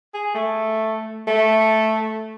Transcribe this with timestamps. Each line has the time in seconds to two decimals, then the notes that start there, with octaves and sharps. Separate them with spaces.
0.14 G#4
0.35 A3
1.27 A3